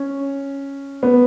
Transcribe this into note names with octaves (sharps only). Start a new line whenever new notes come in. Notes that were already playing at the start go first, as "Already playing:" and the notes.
Already playing: C#4
B3